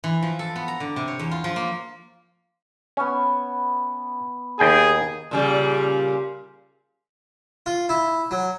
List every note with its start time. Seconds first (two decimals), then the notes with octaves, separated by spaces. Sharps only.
0.04 E3
0.23 F3
0.39 A4
0.56 B3
0.68 A#5
0.80 D3
0.96 C3
1.08 C#5
1.19 E2
1.31 F4
1.44 F3
1.56 A#3
2.97 B3 C#4 G#5
4.59 D#2 G#4 G5 G#5
5.31 A#2 C#3 G3
7.66 F4
7.89 E4
8.31 F#3